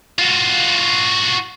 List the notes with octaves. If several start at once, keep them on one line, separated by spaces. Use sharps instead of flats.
F4 F#4